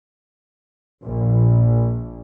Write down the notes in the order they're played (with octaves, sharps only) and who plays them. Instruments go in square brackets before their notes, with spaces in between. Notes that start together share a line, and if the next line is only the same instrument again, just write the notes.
[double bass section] A#1